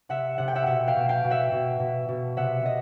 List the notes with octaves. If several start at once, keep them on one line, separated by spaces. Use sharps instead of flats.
C3 E5 F#5
C3 F#5
G5
E5 F#5
B2 E5 F#5
F5 G5
B2
F5 G5
B2
E5 F#5
B2
B2
B2
C3 E5 F#5
C3 D#5